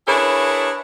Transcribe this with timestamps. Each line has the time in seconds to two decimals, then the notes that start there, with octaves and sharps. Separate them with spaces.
0.08 D4 E4 G#4 A#4 B4 C#5